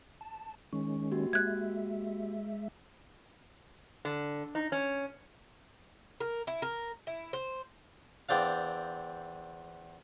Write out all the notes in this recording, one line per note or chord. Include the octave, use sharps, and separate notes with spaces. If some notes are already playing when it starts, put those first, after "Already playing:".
A5
D#3 G#3 C#4 C#6
A#3 F#4 G4
G#3 E5 F#6 G#6
D3
D#4
C#4
A#4
E4
A#4
E4
C5
E2 C4 D4 F5